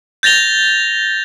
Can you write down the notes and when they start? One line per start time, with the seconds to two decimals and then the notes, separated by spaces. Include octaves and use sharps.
0.23 G6 A6 A#6 F7 G7